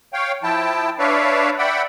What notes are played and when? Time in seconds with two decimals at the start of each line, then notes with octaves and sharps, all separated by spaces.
0.13 C#5 F5 G5
0.43 F3 E4 G5 A5
0.99 D4 B4 C#5 D5 E5 F5
1.58 D5 E5 F#5 G5 B5